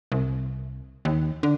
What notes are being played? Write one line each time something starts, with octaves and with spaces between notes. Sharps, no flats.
C2
D#2
D3